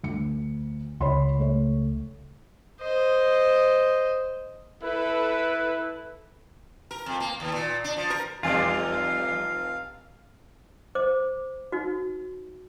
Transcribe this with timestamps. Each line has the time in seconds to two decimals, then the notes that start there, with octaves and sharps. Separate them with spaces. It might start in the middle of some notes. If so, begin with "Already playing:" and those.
0.03 D2 C#7
1.01 C#2 C#5 B5 C6
1.39 A3 C#5
2.81 C5 D#5
4.83 E4 A4 B4
6.91 A#4
7.06 F2
7.20 A#3
7.40 D#2
7.52 A#2
7.84 D4
7.97 F3
8.10 A#4
8.43 F1 E2 G3 F4 D5 F5 G#5 A6
10.95 C5 D6
11.72 D#4 F#4